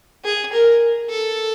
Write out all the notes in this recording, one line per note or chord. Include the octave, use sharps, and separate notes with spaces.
G#4
A#4
A4